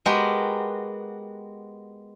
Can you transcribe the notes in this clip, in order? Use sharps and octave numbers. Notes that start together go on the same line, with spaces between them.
G#3 B3 F#4 G4 A#4